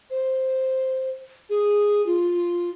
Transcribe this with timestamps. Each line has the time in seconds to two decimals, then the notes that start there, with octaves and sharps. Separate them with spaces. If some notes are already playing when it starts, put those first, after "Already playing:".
0.10 C5
1.50 G#4
2.06 F4